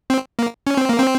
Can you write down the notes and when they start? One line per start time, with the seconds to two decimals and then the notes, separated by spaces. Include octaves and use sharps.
0.10 C4
0.39 A#3
0.67 C#4
0.77 C4
0.89 A#3
0.99 C4